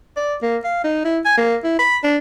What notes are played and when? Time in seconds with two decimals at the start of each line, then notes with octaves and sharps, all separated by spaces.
0.16 D5
0.42 A#3
0.64 F5
0.84 D#4
1.05 E4
1.25 G#5
1.37 A#3
1.64 E4
1.79 B5
2.03 D4